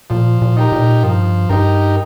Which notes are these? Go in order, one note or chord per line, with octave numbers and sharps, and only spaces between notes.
A#2 F3
A#2
D#4 G4 A#4
A#2
G2 F3
G2 D#4 G4 A#4